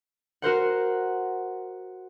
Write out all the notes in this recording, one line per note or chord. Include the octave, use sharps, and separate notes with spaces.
F#4 A#4 C5 F#5